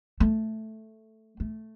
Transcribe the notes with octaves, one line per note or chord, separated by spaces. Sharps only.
A3
A3